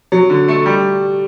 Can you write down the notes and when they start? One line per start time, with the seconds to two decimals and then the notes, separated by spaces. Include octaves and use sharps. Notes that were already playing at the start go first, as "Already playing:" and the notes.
0.12 F#3
0.30 D3
0.48 A3
0.66 G3